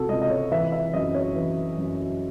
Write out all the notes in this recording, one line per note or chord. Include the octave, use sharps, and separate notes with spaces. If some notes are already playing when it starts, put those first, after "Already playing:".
Already playing: C3 F#4 A4
C#2 D#5
D#5
C#5
E3 E5
E5
F#2 D#5
C#5
E3
F#2